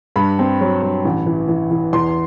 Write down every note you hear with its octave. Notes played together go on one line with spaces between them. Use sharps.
G2 B5
C4
F#3
G2
A1
E3
E3
E3
E2 C6